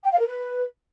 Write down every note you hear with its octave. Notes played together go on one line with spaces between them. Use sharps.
G5
F5
A#4
B4